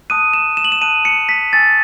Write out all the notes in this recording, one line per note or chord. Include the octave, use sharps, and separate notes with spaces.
A5 D#6 F#6 D#7
E7
E7
F#7
E7
A5 D#6 F#6 D#7
C#7
B6
G#5 C#6 E6 A6